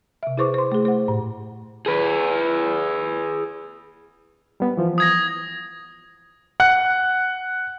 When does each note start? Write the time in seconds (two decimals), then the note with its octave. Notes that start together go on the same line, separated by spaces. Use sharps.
0.23 C3 E5
0.37 E4 G#4 B4 C5 C#6 D6
0.54 C5 C6
0.72 A3 G#4
0.85 C5 F#5
1.08 A2
1.86 G#4 B4
4.60 G3 B3
4.77 E3 F3
4.98 D#6 G#6 A#6
6.60 F#5 F#6